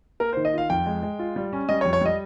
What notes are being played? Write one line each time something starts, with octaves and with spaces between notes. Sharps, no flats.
A#3 A#4
C5
D#3
D#5
F4 F5
F2 G5
G#3
G#3
F4
G3
C#4
G3 D#5
C#5
F2
C#5
G3 D#5